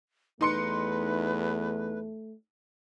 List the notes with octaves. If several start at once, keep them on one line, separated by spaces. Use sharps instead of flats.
E2 A3 D#4 B4 C6 C#7